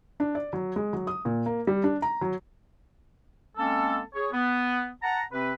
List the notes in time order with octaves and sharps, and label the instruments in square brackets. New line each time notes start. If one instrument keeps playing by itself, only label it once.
[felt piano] D4
D5
F#3
G#3
F#3
D#6
A#2
A#3
G3
D4
A#5
F#3
[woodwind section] G#3 A#3 C4 C#4 A4
G#4 C#5
B3
F#5 A5 A#5
C3 C4 B4